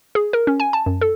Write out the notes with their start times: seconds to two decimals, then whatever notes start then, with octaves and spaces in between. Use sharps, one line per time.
0.15 G#4
0.33 A#4
0.47 C#4
0.60 G#5
0.73 A5
0.86 F#2
1.01 A4